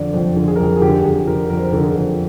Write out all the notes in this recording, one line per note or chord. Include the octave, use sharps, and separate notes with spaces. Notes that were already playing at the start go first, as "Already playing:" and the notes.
Already playing: F2 D3 D5
F2 C5
D3
G#4
A#4
F2 G#4
G#4
D3 G4
F2 G#4
D3 A#4
F2 A#4
C5
A#4
D3
G#4
F2